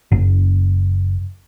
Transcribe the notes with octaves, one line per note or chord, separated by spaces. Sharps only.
F#1